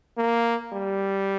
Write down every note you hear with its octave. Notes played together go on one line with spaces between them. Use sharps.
A#3
G3